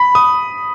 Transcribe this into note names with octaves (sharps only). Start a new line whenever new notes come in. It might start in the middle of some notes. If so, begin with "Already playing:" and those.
Already playing: B5
D#6